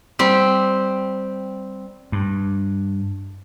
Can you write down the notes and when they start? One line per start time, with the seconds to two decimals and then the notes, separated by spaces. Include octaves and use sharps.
0.19 G3 C4
2.12 G2